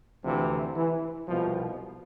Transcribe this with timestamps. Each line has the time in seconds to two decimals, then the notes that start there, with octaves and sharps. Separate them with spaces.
0.23 D2 C3 E3 F3
0.75 E3
1.28 C2 B2 F3